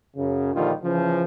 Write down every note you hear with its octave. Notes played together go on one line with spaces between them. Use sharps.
F#2 C#3
A#1 D3 D#3 G3 F4
C#3 E3 F3